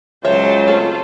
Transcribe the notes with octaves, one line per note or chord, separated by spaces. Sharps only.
C#2 F#3 C5 C#5 E5 A5
A3 C4 F4 A4